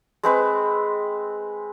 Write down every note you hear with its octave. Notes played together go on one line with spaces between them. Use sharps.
G#3 C4 B4